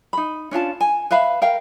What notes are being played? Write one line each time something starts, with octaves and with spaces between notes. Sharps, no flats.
D#4 B5
C#4 D4 F4 A5
G#5
B4 E5 F5 B5
A#4 F5 G5